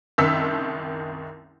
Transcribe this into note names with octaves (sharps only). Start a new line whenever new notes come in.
F#1 C2 D#3 E6 B6